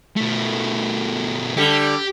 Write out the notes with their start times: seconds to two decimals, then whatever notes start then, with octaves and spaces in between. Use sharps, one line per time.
0.16 B2 A3
1.57 D3 G3 G4